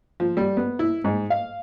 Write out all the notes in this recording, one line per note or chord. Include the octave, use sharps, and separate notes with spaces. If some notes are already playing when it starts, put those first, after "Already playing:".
F3
G3
B3
E4
G#2
F5